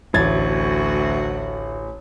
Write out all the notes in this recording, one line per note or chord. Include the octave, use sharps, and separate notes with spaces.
A1 D2 F#4 G#6 A6